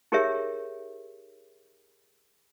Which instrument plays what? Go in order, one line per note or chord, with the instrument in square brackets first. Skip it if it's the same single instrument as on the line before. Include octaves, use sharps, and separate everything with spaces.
[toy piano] D#4 G4 G#4 A#4 C#5 E5